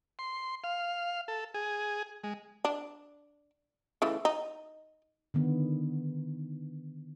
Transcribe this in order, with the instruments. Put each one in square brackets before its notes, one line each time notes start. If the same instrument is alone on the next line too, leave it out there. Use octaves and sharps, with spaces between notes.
[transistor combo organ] C6
F5
A4
G#4
G#3
[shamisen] D4
C#3 E3 A3
D#4
[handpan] D3 D#3 B3